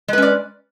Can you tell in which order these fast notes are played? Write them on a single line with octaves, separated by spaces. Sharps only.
G#3 B4 C#4 D5